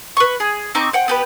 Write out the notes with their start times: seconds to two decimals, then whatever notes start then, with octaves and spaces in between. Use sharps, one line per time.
0.17 B4 C#6
0.40 G#4
0.75 C4 D#4 C#6 D6
0.93 C5 F#5 G5
1.08 B3 G4 B4